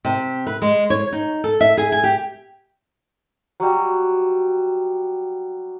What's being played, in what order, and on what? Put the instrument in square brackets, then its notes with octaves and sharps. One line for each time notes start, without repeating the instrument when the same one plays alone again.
[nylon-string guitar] C3
B4
G#3
C#5
D#4
A4
E5
G#4
G#5
G4
[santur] F#3 G3